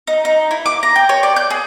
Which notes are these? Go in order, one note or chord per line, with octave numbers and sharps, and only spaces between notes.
D#4
D#4
E4
D6
A#5
G5
C#5
D5
G6
G#4